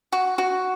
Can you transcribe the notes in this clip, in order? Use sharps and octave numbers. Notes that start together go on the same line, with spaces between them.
F#4
F#4